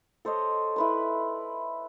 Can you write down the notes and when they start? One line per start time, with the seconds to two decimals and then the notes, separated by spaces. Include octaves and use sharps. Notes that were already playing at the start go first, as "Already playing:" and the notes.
0.25 A4 C5 C#5 D#5
0.76 E4 B4 C6